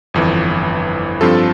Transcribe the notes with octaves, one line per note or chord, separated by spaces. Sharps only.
G1 F2 E3
G2 F3 C4 F4 A4